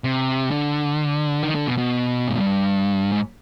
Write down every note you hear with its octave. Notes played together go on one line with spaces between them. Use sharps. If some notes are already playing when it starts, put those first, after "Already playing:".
C3
D3
D#3
D3
B2
B2
G#2
G2
G#2